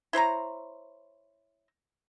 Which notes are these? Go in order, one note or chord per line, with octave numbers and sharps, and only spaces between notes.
E4 C5 C#5 A#5